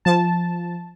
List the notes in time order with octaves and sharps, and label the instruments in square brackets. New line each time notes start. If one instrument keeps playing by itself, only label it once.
[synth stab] F3 A5